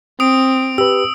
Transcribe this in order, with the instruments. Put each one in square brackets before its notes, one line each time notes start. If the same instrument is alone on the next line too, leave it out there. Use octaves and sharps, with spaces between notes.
[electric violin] C4 [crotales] D#6 D7
[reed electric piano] G4 B4 [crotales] E6